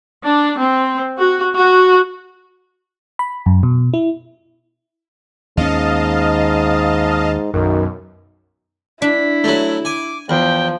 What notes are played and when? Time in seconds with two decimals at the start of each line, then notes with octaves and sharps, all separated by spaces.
0.25 D4
0.58 C4
1.17 F#4
1.56 F#4
3.19 B5
3.46 F#2
3.63 B2
3.94 E4
5.57 D#2 G#2 C#4 D#5 F5 A5
7.54 B1 F#2 D#3
9.02 D4 E4 B6
9.44 F#3 A3
9.85 G#5 D6
10.29 E2 F3 G5